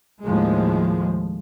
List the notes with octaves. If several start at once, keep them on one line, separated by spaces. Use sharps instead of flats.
D#2 A2 F3 G#3